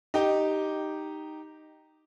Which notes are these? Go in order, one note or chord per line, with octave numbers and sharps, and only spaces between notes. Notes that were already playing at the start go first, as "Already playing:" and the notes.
D#4 G4